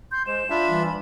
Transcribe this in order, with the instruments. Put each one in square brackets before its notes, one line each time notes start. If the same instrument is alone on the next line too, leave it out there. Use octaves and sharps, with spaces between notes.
[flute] C6 [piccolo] G6
[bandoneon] G#3 [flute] C5 [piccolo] E7
[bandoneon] D4 F4 E5 [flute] B5
[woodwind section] E3 G3